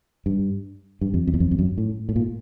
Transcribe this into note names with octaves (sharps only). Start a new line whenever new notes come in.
G2
G2
F2
F2
E2
F2
F2
F#2
A2
A2
A#2